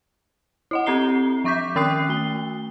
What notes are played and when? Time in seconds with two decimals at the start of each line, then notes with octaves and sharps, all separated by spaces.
0.71 E4 D#5 F#5
0.86 C4 G4 A#5 C7 G7
1.44 F3 E5 C#6 D6 G6 B6
1.76 D#3 C#4 G5 D#6 F#6 C7
2.09 A3 G7